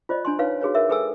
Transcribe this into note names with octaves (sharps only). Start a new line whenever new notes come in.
F4 C5 D5 D#5
D4 G#5 C6
D#4 B4 C#5 F5
F#4 G#4 B4 C#5
A#4 E5
G#4 A4 B4 G5 G#5 E6